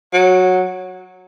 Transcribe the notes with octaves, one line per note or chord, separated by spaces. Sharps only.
F#3